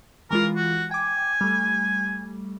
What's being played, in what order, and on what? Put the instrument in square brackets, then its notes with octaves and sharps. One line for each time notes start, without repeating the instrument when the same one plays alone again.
[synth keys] E3 G#3 F4 [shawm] A#4
[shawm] F#4
[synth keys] G5 D6 [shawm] G#5
[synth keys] G3 A3